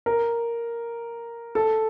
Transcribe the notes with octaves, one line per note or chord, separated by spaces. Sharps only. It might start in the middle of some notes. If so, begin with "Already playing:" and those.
A#4
A4